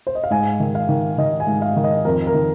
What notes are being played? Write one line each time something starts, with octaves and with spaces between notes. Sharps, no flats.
C5
D#5
F5
G#2 G#5
D#3
F5
D#3
D#3 D#5
G#5
G#2
F5
D#3
D#5
F2 A#4
A#4
D#3